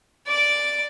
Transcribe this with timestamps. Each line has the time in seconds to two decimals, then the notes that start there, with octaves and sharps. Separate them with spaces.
0.27 D5 D6